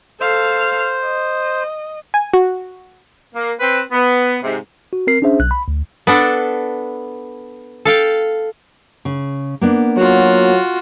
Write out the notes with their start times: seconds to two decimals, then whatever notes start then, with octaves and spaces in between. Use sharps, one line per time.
0.20 A4 C5 F5
1.04 D#5
2.14 G#5
2.34 F#4
3.35 A#3
3.60 C4 B4
3.92 B3
4.43 G#2 C3
4.93 F#4
5.07 C4 A#4 C7
5.22 C#4 D4 G#4 C5 E5
5.40 B1 F#6
5.51 B5
5.68 D2
6.07 B3 D4 A4
7.85 A4 F5 G5
9.05 C#3
9.61 A#3 B3 D4
9.97 F#3 F4 F#4